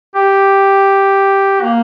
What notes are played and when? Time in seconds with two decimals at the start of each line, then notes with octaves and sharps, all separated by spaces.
0.15 G4
1.61 A#3